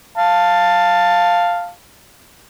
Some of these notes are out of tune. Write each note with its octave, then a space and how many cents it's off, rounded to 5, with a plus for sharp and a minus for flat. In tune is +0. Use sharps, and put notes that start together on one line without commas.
F5 +0 A5 +10